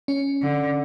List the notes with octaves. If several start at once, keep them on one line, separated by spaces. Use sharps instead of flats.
C#4
D3